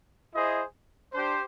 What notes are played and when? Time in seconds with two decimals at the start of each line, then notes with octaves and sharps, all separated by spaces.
0.34 E4 G#4 C5 D#5
1.13 D4 G4 C5